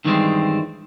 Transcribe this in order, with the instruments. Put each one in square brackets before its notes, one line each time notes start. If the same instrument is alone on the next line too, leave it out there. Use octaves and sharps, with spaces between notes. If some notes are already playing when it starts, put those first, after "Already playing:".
[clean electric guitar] G2 D#3 E3 G3 G#3 C4